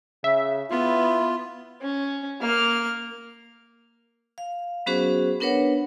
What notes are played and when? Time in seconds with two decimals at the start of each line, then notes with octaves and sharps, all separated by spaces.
0.24 C#3 E5
0.71 B3 E4 F4
1.82 C#4
2.41 A#3 F6
4.38 F5
4.86 F#3 B3 C#4 F#4 G#4 C5
5.40 B3 D4 A#4 B4 C#5 F#5